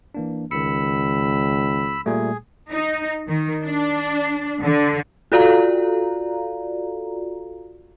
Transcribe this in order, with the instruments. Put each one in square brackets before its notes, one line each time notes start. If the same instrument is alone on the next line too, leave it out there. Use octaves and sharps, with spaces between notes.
[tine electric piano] E3 A#3 D4
[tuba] C#2 [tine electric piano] D#3 C#7 [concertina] B5 E6
[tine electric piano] A#2 G3 A3 [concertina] G#4
[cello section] D#4
D#3
D4
D3
[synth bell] F4 F#4 A4 D5 F5 A#5